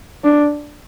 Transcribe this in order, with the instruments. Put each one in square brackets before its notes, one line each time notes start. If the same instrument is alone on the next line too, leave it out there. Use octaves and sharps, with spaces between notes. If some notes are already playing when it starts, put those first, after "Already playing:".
[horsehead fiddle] D4